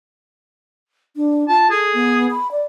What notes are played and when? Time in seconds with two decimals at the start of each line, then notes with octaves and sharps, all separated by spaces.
1.16 D4
1.48 F4 A5
1.71 G#4 A4
1.94 B3
2.31 B5
2.51 D5